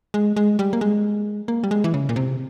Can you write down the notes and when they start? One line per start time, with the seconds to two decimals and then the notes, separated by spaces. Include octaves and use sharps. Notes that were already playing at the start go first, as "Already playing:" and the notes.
0.14 G#3
0.36 G#3
0.59 G3
0.73 A#3
0.81 G#3
1.48 A#3
1.64 G3
1.71 G#3
1.84 E3
1.94 C#3
2.09 A#2
2.16 C3